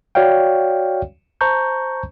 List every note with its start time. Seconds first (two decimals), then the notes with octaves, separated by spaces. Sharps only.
0.15 F#4 C#5 D5 F5 G5
1.41 C5 A5 A#5 C#6 G6